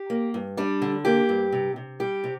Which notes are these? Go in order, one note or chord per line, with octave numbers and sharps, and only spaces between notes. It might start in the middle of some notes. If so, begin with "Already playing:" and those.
Already playing: G4
A#3
G2
G3 D4
D3
A#3 G4
G2
C3
C3
G3 G4
C3